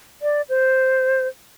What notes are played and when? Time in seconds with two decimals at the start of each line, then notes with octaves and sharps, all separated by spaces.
0.22 D5
0.49 C5